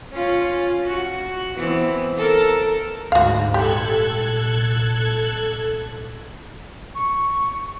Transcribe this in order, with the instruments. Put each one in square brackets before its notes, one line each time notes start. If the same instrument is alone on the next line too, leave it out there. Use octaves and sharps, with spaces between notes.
[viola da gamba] C#4 F4
F#4
E3 B3 C4
A4 A#4
[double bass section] D2 [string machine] G#2 [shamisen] F#4 F5
[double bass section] C2 A#2 [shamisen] G4 [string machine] A4 F#6 G#6
[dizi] C#6